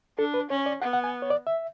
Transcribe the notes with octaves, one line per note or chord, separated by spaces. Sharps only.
D4 A4
B4
C#4 C#5
D5
B3 F#5
F#5
G#5
C#5
D5
E5